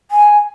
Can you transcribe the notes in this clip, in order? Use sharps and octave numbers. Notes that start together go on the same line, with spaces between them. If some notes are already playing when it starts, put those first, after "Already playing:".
G#5